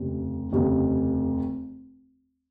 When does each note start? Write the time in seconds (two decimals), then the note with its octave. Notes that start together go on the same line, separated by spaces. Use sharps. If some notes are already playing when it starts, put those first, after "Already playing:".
Already playing: F1 D#2 C#3
0.52 F1 D#2 C#3